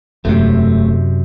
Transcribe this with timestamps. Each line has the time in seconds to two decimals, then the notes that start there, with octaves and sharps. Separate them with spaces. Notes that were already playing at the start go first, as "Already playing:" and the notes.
0.25 E1 F#2 C3 A3